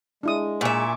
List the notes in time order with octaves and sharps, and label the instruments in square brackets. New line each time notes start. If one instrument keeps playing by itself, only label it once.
[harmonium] G#3 [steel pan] D4 E4 D#6
[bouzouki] A#2 E5 [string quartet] G#5 C#6 D6